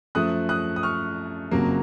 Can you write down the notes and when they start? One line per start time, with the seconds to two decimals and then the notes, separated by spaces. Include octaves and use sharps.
0.15 F#2 F3 A3 D#6 F#6
0.49 D#6 F#6
0.76 D#6
0.83 C#6 F6
1.51 F#1 F2 C#3 F#3 A#3